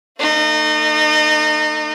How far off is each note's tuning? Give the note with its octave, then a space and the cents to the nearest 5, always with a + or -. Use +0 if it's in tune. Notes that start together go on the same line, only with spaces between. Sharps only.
A3 +35 D#4 -30